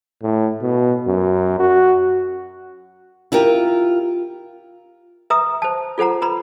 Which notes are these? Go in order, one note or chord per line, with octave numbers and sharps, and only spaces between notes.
A2
B2
F#2
F#4
E4 F4 G4 A#4
B4 E5 A#5 D#6
C5 A5
F4 A4 C5 F#5 A#5
B4 A#5 B5